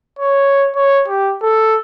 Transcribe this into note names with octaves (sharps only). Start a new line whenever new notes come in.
C#5
C#5
G4
A4